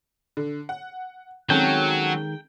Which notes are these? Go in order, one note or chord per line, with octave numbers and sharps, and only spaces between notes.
D3
F#5
D#3 F#3 G#3 C4 C#4 A4 G5